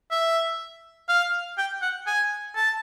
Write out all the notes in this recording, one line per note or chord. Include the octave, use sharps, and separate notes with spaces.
E5
F5
G5
F#5
G#5
A5